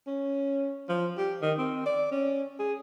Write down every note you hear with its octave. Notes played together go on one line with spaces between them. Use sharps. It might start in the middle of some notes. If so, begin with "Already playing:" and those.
C#4
F3
G4
D#3
C4
D5
C#4
G#4